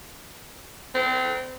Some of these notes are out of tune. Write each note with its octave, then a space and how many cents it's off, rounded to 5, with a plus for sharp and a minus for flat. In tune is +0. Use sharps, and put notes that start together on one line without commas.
C4 -30